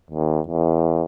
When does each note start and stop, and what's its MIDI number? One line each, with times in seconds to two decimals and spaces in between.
0.11 0.40 39
0.48 1.05 40